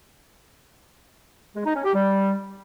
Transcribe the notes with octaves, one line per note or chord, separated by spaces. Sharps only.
G#3
D#4
C#4
G4
G3